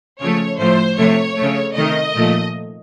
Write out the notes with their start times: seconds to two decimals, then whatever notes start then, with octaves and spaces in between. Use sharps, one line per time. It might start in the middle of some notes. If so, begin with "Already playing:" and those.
0.20 C#3 F3 A3 C#5
0.59 A2 F3 A3 C5
0.97 C3 F3 A3 C#5
1.37 C#3 A3
1.75 C3 D#3 A3 D#5
2.15 A#2 F3 A3